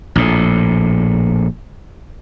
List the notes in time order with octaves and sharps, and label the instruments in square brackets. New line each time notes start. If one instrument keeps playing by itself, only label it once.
[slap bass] A#1 A2